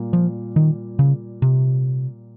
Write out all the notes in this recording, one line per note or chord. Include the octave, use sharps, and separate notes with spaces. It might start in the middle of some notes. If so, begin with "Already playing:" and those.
Already playing: A#2 G3 A#3
F3
D#3
C#3
C3